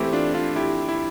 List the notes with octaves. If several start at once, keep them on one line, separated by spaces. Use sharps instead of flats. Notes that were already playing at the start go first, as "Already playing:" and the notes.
Already playing: E3 A3 C4 E4 G4
D4 F4
D4 F4
E4 G4
E4